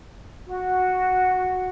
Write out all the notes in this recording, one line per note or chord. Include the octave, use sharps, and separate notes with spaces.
F#4